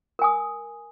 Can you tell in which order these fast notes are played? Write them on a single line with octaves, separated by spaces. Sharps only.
A#4 G#5 D#6